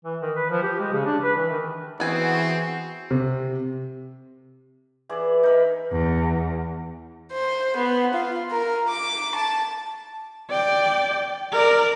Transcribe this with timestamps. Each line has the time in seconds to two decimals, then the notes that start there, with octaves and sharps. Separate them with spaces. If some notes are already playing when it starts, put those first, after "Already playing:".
0.05 E3
0.22 D#3
0.36 B4
0.50 F3
0.63 G4
0.80 G#3
0.92 C#3
1.06 D4
1.23 B4
1.37 E3
1.50 D#3
2.00 E3 B3 C4 F#4 G#4 G#5
3.11 C3
5.09 E3 G#4 D5
5.43 D#4 A#4 B5
5.91 E2
7.32 C5
7.77 B3
8.14 F4
8.51 A#4
8.88 D6
9.35 A5
10.50 D5 G5
11.52 A#4 D5